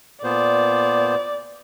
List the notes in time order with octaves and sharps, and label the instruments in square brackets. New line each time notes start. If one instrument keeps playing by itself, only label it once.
[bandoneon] A#2 B3 C5 [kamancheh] D5